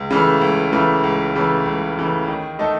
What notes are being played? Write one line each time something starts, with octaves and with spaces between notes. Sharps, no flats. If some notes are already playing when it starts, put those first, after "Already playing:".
Already playing: C#2
C#3 E3 A3
C#2
C#3 E3 A3
C#2
C#3 E3 A3
C#2
C#3 E3 A3
D#3
A3 D#4 A4